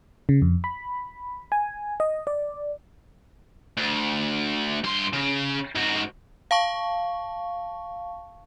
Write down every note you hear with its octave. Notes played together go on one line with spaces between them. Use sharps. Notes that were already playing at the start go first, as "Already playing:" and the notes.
C#3
F2
B5
G#5
D#5
D5
D2
G2 C6
C#3
G#2 F#4
F5 A5 C#6